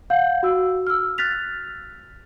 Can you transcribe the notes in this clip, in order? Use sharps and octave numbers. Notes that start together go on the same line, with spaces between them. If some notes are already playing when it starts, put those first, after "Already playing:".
F5 F#5 G6
F#4 E6
E6 F6
F6 F#6 A6 B6 F7